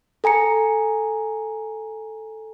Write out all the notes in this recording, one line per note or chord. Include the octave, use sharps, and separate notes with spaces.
A4 G#5 A#5 C#7